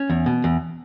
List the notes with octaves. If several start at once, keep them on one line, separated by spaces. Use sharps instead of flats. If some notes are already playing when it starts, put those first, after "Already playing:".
Already playing: C#4
E2
B2
E2